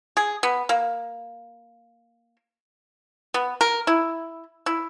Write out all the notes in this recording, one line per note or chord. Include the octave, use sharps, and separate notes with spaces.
G#4
B3
A#3
B3
A#4
E4
E4